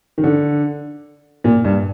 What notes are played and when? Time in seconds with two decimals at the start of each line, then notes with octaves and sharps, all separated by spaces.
0.18 D#3
0.24 D3
1.44 A#2
1.64 G2